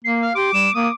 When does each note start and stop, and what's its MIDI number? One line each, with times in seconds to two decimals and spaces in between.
0.04 0.30 58
0.04 0.26 96
0.22 0.30 77
0.35 0.51 67
0.35 0.50 84
0.35 0.71 86
0.53 0.69 55
0.53 0.73 100
0.74 0.88 58
0.74 0.94 86
0.74 0.89 87